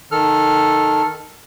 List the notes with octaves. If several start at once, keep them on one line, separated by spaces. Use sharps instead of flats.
D#3 A4 F6